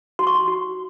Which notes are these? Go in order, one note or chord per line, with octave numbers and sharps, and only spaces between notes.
F#4 C6
C#6
C6
F#4